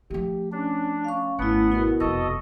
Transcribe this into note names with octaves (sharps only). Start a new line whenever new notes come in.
F3 A3 G4
C#4 D4
C#4 F5 C#6
G#1 A3 B3 E4 F#5
B2 E4 A#4
F1 G2 A4 D#5 C#6